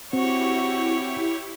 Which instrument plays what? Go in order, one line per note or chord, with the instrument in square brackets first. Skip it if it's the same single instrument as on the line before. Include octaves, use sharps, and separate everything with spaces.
[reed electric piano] C4 [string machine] E4 G4 [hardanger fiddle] F#4 [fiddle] C#5